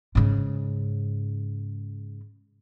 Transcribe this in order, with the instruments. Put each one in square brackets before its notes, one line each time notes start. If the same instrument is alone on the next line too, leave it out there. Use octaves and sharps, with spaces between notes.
[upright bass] G#2 C#3